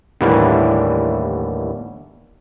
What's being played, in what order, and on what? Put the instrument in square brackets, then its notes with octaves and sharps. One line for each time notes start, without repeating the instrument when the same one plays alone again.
[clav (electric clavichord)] D#2 A2 D3 E3 G3